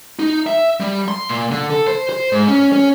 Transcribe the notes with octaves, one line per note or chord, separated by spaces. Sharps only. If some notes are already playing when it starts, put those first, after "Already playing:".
D#4
E5
G3
C6
A#2
D3
A4
C5
C5
G#2
C#4
C#4